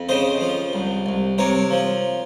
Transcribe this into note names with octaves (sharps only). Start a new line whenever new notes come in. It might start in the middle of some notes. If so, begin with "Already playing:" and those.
Already playing: F2
C#3 C5 D#5
F3
C2
C2
C3 A#4 C#5
F3